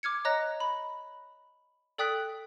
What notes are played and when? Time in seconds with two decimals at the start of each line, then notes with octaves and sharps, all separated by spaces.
0.03 D6 F6 G#6 C#7
0.25 C#5 D#5 A#5 F#6 A#6
0.60 B5
1.98 A4 D5 G5 D#6 F#6 B6